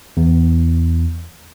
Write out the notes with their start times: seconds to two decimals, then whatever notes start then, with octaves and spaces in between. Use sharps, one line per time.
0.17 E2